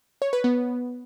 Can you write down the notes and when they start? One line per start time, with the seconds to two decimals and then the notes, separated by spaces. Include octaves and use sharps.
0.22 C#5
0.33 B4
0.44 B3